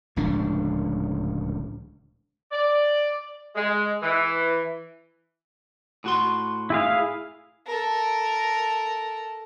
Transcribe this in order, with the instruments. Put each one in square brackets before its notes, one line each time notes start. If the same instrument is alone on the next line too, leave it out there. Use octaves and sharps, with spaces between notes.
[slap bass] D1 C#2 F3 D4
[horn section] D5
G#3
E3
[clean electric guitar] A2 F#4 C6
[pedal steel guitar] E4 G#4 F5
[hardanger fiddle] A4 A#4